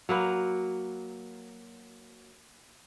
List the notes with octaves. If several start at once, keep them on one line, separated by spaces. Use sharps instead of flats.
F#3 A#3 B4